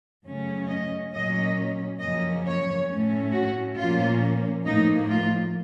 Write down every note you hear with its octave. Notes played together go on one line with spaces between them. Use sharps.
F#2 C#3 A3 C#4
D#5
A#2 F#3 A#3 C#4 D#5
F#2 C#3 F3 A#3 C#4 D#5
C#5
A2 A3 C#4
F#4
A#2 F3 A#3 C#4 F4
A2 F3 A#3 D#4
F4